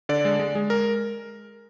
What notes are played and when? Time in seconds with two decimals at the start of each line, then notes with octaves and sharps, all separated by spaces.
0.09 D3 D5
0.25 G#3
0.39 G#3
0.55 G#3
0.70 A#4